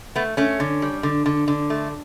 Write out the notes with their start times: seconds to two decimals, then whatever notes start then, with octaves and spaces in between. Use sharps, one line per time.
0.16 A3 B3
0.37 A3 C#4
0.60 D3
0.82 G3
1.03 D3
1.26 D3
1.48 D3
1.70 A3